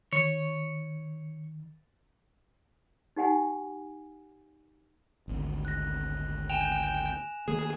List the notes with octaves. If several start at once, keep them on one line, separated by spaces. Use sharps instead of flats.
D#3 C#5
D#4 G4 F#5 G#5
G#1 D2
F#6 A#6
G5 G#5 E7 F7
D#3 A3 A#3 G#4